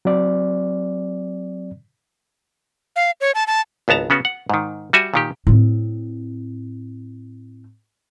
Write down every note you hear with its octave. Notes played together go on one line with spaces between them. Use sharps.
F#3 C4 D5
F5
C#5
A5
A5
G#1 C#2 B3 A5 A#5
C#3 B3 C#4 F#4
F#5
G#2 D#3
G3 F#4 E5 G#5
A#2 D#3 G4
A2 C4